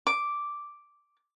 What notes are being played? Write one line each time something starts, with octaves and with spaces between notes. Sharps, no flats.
D6